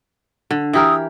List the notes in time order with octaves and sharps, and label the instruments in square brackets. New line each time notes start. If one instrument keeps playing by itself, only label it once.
[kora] D3
[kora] E3 G4 A#4 [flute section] A#5 D#6 E6